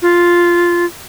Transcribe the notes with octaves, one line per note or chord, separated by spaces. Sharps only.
F4